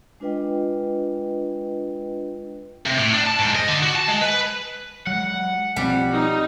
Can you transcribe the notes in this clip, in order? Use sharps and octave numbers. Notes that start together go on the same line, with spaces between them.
G#3 D4 F4 B4 D#5 G5
C3
A2
D4
A5
G#2
D#5
D3
F#4
A5
G#3
B4
F#3 G#3 F#5
B1 F3 G3 C4
D#4